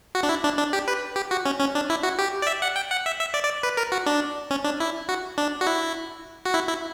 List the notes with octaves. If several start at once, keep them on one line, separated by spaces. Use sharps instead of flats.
F#4
D4
E4
D4
D4
G4
B4
G4
F#4
C#4
C#4
D4
E4
F#4
G4
D5
E5
F#5
G5
F#5
E5
E5
D5
D5
B4
A#4
F#4
D4
C#4
D4
E4
F#4
D4
F#4
E4
F#4
E4
E4